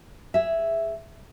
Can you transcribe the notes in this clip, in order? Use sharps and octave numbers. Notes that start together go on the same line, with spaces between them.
G#4 E5